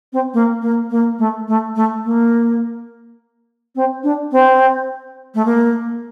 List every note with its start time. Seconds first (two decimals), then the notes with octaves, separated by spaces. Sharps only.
0.12 C4
0.33 A#3
0.61 A#3
0.90 A#3
1.18 A3
1.47 A3
1.75 A3
2.04 A#3
3.75 C4
4.03 D4
4.31 C4
5.34 A3
5.45 A#3